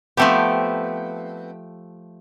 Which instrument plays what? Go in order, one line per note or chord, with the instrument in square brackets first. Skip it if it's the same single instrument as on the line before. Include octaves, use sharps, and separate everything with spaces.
[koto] F3 A3 G4 [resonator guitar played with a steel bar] B3 C4